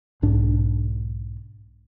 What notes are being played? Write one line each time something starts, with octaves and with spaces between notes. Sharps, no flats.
B1 G#2 D4